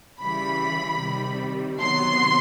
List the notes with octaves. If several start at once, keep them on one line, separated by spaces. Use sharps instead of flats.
C#3 E3 G3 B5
C3 D#3 G3
C3 D#3 F#3 B3 C6